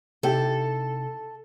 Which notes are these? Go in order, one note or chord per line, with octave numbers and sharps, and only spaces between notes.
C3 D#4 E4 G4 A4